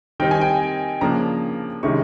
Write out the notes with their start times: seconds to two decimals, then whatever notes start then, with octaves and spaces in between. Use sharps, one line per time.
0.20 D#3 G3 C4 D#4 G5
0.31 G#5
0.41 G5
1.01 C#3 F3 A#3 D4 A#5
1.83 C3 D#3 G#3 C#4 E4 C#6